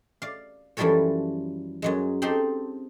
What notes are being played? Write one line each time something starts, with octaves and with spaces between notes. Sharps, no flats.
D5 F5
F#2 E3 F3 G3 A4 C#5
F#2 F#3 G#3
C4 D#4 G4 A4 C6